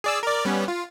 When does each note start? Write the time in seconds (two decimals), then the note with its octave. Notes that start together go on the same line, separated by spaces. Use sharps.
0.04 G#4 D5 E6
0.23 A#4 D5
0.45 G3 B3 C#4
0.68 F4